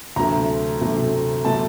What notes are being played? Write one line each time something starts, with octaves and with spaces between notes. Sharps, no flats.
D2 C3 F#3 A3 A#5
D2 C3 F#3 A3
C3 F#3 A3 A5